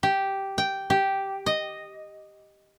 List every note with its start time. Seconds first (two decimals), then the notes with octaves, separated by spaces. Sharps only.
0.03 G4
0.58 G5
0.90 G4
1.46 D#5